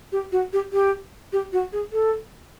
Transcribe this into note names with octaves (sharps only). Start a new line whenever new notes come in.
G4
F#4
G4
G4
G4
F#4
G#4
A4